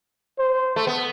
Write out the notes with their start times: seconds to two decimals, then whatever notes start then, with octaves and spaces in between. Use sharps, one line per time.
0.39 C5
0.76 A3
0.87 B3